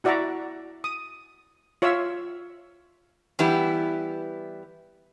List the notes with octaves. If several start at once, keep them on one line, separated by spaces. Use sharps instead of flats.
E4 F#4 D5 E5 F#5 A#5
D#6
F4 C#5 E5 F5 E6
E3 G3 B3 E4 G4